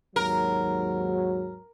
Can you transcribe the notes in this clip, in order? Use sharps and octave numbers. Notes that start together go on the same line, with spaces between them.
D#2 G#2 F#3 A#4